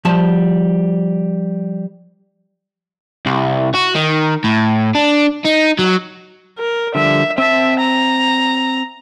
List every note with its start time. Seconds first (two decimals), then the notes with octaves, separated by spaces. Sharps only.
0.05 F3 G3 A5
3.26 C2
3.75 F#4
3.95 D#3
4.44 A2
4.95 D4
5.45 D#4
5.79 F#3
6.58 A#4
6.95 D3 F3 G3 E5
7.38 C4 E5 A5
7.80 A#5